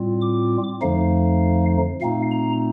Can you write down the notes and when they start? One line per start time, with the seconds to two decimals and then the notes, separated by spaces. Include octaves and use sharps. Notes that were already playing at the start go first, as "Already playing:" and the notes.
Already playing: A2 G3 C4 F4
0.22 D6
0.82 F2 D3 F3 A3 D#4 F5
2.01 A#2 A3 C4 D#4 F5
2.31 A#5